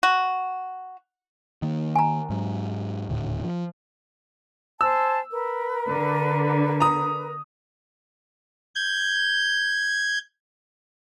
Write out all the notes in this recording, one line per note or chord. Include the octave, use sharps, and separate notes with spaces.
F#4
D#3 A#3
G#5 A#5
G#2 F#3
D#1 D2 A2
F3
C5 G#5 A5 E6
A#4 B4
D3
A#5 D#6
G6 G#6